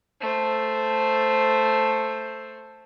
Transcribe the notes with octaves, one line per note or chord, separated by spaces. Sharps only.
A3 C5